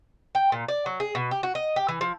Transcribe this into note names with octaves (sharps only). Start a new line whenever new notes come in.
G5
A#2
D5
F#3
G#4
B2
G4
F#4
D#5
G4
E3
F3